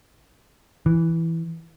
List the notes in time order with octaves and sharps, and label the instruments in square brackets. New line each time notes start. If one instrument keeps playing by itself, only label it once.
[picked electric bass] E3